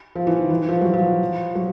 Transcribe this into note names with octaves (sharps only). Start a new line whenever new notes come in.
F3
E3
D#3
E3
F3
F#3
F3
F#3